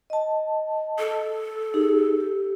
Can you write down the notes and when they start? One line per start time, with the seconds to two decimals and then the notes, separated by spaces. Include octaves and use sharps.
0.10 D#5 A5
0.99 A4
1.74 D#4 G4 G#4
2.20 G4